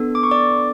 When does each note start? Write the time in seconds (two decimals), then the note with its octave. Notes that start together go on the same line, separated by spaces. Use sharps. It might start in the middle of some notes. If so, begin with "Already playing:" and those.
Already playing: B3 D4 A4
0.15 D6
0.23 C#6
0.31 D5 D6